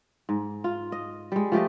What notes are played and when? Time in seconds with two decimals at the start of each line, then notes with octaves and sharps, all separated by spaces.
0.29 G#2
0.64 F4
0.92 D#5
1.32 G3 G#3
1.52 F3 A3 G4 D#5